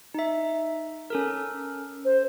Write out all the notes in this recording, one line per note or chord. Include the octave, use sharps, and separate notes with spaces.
D#4 E5
C#4 A4 A#4
C5